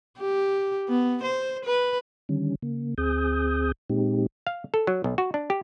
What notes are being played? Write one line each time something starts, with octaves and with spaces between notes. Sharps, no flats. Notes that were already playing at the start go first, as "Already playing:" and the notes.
G4
B3
C5
B4
D3 D#3 G3 C#4
C#3 A#3
D2 C4 G#4 D#6 G6
A#2 G#3 C4 D#4 G4
F5
A4
F#3
B1
F#4
D4
G4